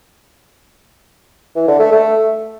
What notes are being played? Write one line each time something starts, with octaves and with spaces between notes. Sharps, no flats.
E3
D3
A3
A3